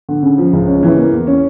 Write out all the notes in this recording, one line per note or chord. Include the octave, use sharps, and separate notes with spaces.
D3
C#3
F3
C#2
C#4
E3
A#3
E2
C#4